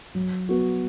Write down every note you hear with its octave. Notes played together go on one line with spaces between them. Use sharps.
F#3
B3 F#4